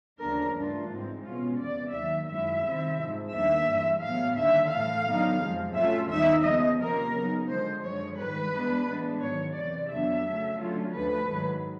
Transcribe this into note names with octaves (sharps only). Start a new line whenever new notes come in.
D2 C#3 F3 A#3 D4 A#4
G2 E3 A3 D4 F4
G#2 E3 G#3 C4
B2 G#3 C#4 F4
E2 C3 E3 D5
D#2 D#3 F#3 E5
F#2 D#3 G#3 C#4 E4 E5
C3 D#3 G3 C4 E4
G#2 F3 G#3
D#2 D#3 G3 A#3 D4 E5
G2 E3 G#3
A2 F#3 B3 F5
D#2 D3 G3 E5
A2 E3 A3 F5
D3 F#3 B3 D#4
F2 C3 F3 G#3
A2 F#3 A3 C#4 F4 E5
D#2 D#3 G3 B3 D#4 E5
C#3 F3 G#3 B3 D#5
C3 F3 A#3 C#4 A#4
C#3 F#3 B3 D#4
D3 F3 G#3 C5
F#2 D3 F3 G#3 C#5
G#2 D#3 G3 B4
G2 E3 G#3 B3 D4
A2 E3 G#3 B3 D4
G#2 D#3 F#3 C#5
E2 C3 E3 D5
F2 D3 F#3 B3 D4 E5
C#3 F#3 A3
D3 F#3 A3 C#4 F4
D2 D3 F3 A3 B4
G#2 D#3 F#3